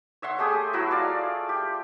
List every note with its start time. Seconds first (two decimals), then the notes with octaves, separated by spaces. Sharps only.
0.22 C#5 E5 F#5 C6
0.39 A3 G4 G#4 D#6
0.73 F#3 E4 F#4
0.91 F4 D5 F5
1.49 G4